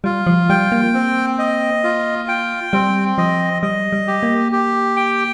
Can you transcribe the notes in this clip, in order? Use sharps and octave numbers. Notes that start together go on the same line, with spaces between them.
G3 F4
F3
G3 G5
A#3
C4
D#5
F4
G5
G3 C4
F3 D#5
G3 D#5
G3
G4
A#3
G4
G5